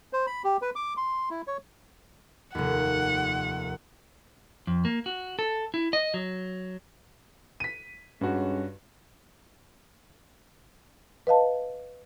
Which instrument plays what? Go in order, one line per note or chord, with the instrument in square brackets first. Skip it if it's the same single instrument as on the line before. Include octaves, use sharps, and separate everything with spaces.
[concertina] C5
B5
G4
B4
D6
C6
E4
C#5
[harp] F1 D#2 [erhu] F#5
[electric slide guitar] F2
A#3
F#4
A4
E4
D#5
F#3
[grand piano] B6 D#7
[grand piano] G2 F#4 [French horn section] G3 G#3 C#4
[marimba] B4 D#5 F5 A5